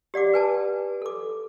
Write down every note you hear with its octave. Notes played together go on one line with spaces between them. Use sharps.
G4 D5 F#5 D6
B4 G#5 A5
A4 D6